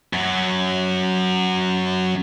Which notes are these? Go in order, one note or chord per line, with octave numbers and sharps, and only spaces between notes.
F#2 F#3